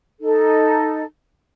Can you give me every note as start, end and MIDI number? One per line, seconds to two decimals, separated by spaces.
0.21 1.03 63
0.21 1.03 69